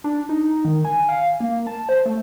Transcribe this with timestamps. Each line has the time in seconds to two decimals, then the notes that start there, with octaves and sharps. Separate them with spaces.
0.04 D4
0.29 D#4
0.65 D#3
0.85 G#5
1.08 F5
1.40 A#3
1.67 A5
1.89 C5
2.06 A3